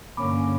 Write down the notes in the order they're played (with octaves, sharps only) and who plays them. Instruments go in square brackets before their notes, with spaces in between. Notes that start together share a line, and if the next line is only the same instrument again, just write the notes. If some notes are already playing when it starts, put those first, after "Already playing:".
[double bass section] G2 D3 A#3 C#4 [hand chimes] B5 D6